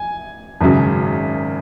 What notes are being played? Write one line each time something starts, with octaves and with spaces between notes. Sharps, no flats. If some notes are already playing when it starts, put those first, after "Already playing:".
Already playing: G#5
G#1 F#2 C#3 F#3